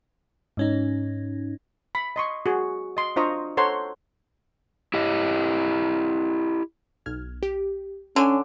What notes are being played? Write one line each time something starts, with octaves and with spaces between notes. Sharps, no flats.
G#2 C#4 D#4
B5
D#5 C6 C#6
F#4 G#4
D#5 C6
D4 F4 C5 D#5 A#5 C#6
A4 C5 C#5 F#5 A#5 C6
E4 G4 D#5
B1 F6 G#6
G4
D3 C#4 C#5 G#5